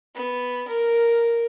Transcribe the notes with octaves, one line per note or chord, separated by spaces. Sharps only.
B3
A#4